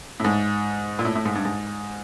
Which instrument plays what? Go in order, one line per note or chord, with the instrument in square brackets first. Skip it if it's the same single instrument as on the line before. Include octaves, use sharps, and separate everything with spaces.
[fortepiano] A2
G#2
A#2
A2
A2
G#2
G2
G#2